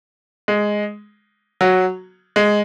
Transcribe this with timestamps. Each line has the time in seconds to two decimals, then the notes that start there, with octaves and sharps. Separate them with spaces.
0.48 G#3
1.61 F#3
2.36 G#3